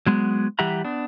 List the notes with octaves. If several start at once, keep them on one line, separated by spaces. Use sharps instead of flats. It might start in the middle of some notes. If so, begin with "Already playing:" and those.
F#3 G#3 B3
E3 G3 G4 E5 F#5 A#5
B3 D4